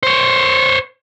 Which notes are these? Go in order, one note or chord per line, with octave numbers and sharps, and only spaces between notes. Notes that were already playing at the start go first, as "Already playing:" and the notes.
C5 C#5